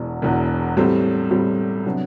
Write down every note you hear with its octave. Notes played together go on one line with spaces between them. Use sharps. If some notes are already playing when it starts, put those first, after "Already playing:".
Already playing: E1 E2 B2
E1 E2 B2
A2 G3 C4 G4
A2 G3 C4 G4
C3 F#3 B3 D4